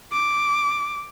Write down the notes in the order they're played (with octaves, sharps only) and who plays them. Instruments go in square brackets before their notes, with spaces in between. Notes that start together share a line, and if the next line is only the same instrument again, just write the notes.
[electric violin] D6